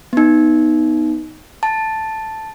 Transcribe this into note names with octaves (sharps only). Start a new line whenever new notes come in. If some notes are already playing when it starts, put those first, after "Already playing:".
B3 D#4
A5